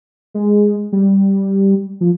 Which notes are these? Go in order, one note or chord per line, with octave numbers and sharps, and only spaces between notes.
G#3
G3
F3